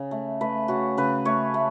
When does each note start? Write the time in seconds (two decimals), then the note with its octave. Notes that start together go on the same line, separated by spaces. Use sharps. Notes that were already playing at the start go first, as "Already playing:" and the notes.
Already playing: C#3
0.11 A3
0.41 A3 B4
0.68 C#3 F#4
0.97 C#3 B4
1.25 A3 C#5
1.54 A3